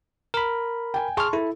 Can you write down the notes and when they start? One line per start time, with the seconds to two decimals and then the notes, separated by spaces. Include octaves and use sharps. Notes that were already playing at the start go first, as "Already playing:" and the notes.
0.34 A#4 B5
0.94 G5 G#5
1.17 G#4 A5 C6 C#6 F6
1.33 E4 A4